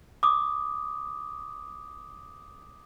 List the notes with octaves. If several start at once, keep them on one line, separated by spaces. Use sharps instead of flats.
D6 D#6